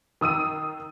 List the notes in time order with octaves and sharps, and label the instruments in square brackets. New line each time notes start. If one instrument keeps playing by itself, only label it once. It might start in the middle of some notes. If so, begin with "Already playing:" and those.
[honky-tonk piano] D#3 D#6 E6 D#7